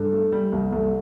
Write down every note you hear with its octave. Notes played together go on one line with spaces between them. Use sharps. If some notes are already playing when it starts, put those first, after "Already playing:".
Already playing: G2 A4
A3
G3
C2
C2 A4